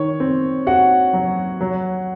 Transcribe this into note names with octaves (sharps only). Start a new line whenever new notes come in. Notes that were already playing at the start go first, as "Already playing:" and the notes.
Already playing: D#3 C#5
C4
F#4 F#5
F#3
F#3